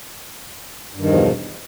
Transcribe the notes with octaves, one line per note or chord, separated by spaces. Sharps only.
E2 G2 B2 D#3 F3